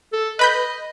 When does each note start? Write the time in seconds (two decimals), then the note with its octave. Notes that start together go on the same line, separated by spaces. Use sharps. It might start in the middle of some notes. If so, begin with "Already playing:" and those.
0.13 A4
0.39 B4 D#5 B5 G6